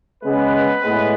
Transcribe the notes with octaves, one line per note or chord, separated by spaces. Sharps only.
C#3 G#3 B3 B4
A2 G#3 B3